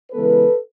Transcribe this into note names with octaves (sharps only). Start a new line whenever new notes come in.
C#3 E3 G#3 B3 A4 B4